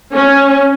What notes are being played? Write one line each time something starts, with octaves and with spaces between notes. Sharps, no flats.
C#4